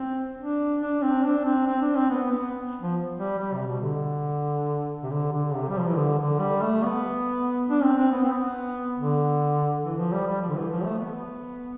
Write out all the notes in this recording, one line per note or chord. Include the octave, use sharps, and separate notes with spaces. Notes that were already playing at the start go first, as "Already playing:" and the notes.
Already playing: C4
D4
D4
C4
D4
C4
C4
D4
C4
B3
B3
F3
G3
G3
C3
B2
D3
C3
D3
D3
C3
G3
F3
E3
D3
D3
G3
A3
B3
D4
C4
C4
B3
C4
B3
D3
E3
F3
G3
G3
F3
D3
E3
F3
A3
B3